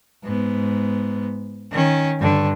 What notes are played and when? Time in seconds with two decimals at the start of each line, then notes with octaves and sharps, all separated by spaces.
0.24 G#2 B3
1.71 D#3 C#4
2.19 G2 D3